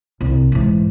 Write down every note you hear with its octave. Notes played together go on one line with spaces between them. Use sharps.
C2
G#2 E3